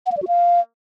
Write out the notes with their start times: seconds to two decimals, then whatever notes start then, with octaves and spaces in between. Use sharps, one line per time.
0.06 F#5
0.12 F5
0.17 D5
0.22 F#4
0.28 F5